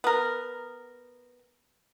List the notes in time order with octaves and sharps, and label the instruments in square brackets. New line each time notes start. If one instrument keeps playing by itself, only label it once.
[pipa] B3 A#4